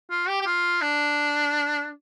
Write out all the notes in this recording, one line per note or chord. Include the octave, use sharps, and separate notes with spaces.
F4
G4
G4
F4
D4